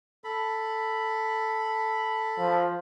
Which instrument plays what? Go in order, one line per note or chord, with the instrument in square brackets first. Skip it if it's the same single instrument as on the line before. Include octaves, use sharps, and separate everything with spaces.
[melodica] A4 B5
[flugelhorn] F3